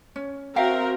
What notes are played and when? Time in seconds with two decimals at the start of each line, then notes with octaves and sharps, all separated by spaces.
0.16 C#4
0.56 C4 F#4 A#4 E5 F5 G5